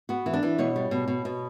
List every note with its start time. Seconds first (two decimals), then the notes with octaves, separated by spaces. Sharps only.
0.09 B3 F#4
0.26 E3
0.34 D4
0.43 E3
0.58 B2 C#5
0.76 G3
0.91 B2
1.08 B2
1.25 B2